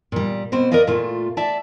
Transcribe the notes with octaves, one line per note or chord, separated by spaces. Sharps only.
A#2 G3
B2 C4 C5
A#4 B4 D5 D#5 F5
A#2 A3 F4
D5 E5 A5